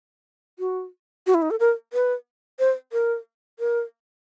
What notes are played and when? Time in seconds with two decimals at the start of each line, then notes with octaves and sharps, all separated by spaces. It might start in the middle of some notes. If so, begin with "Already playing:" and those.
0.59 F#4
1.27 F#4
1.34 E4
1.42 D#4
1.51 A4
1.60 A#4
1.93 B4
2.59 C5
2.92 A#4
3.59 A#4